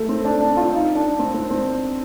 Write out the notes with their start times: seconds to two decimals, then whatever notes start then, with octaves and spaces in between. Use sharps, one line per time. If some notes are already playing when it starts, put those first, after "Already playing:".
Already playing: A3
0.09 C4
0.25 D4
0.41 D4
0.57 F4
0.72 D#4
0.95 D4
1.19 C4
1.34 C4
1.50 C4